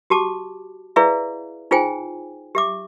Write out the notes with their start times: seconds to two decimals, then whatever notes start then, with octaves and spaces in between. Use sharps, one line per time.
0.10 F#4 G4 A5 D6
0.96 E4 G#4 B4 D5 E5 F5
1.71 D#4 F4 G#4 C5 G5 G#5
2.55 G4 E5 D6